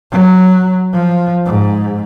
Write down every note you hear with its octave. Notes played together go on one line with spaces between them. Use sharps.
F#3
F3
G#2